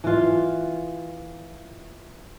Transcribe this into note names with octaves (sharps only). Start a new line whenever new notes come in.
E3 F4